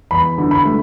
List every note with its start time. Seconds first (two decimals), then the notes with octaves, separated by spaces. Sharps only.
0.11 E2 B5
0.38 D3
0.51 B5
0.65 A3